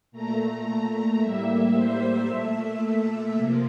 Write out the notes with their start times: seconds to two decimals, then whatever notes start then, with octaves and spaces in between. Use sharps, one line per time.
0.12 A#2 A3 A#5
1.19 A2 G3 A#3 E5
1.73 C5
2.27 A#2 A3 E5
3.34 C3 F3 A#3